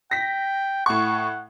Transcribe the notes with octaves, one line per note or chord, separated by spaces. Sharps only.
G5 A#6 B6
A2 F#5 C#6